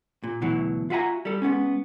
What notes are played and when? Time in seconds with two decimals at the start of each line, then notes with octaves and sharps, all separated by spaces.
0.24 A#2
0.41 D2 B2 E3 F#3
0.90 F4 F#4 E5 G#5 A#5
1.25 G3 A4
1.42 G#3 A#3 B3 C#4